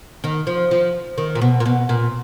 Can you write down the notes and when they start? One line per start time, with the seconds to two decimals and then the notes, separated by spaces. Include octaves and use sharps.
0.24 D#3
0.47 F3
0.71 F3
1.18 D#3
1.35 A#2
1.41 B2
1.60 A#2
1.66 B2
1.89 A#2